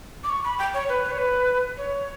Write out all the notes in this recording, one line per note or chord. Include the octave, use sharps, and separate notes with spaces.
D6
C#6
B5
G5
C#5
B4
B4
C#5
B4
C#5